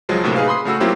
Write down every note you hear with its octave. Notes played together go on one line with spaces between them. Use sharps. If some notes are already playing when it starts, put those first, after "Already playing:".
C#2 F3 F#3 G#3
D2 A2 C3 A#3
D#4 G#4 B4 F5
B5 C6 D#6 C7
C#3 A3 F#4 E6
F#3 A#3 C4 E4 F4 G4